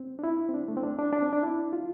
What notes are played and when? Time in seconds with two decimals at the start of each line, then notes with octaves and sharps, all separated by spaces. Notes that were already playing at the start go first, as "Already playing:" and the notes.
Already playing: C4
0.19 D4
0.24 E4
0.49 C4
0.54 D4
0.68 A3
0.77 C4
0.83 D4
0.98 D4
1.13 D4
1.22 C4
1.33 D4
1.43 E4
1.73 F4